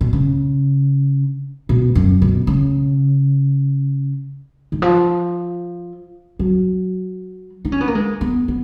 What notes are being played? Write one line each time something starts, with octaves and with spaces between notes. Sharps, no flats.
B2
C#3
B2
F#2
B2
C#3
D#3
F3
F#3
D#4
C#4
B3
A#3
G#3
B3
B3